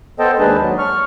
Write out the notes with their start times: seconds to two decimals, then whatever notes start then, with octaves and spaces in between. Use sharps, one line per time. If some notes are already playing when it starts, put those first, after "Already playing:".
0.19 B3 A4 C5 D#5 G5 A5
0.39 D#2 G#3 D4 G#4 B4 A5
0.60 F#3
0.78 C#6 F6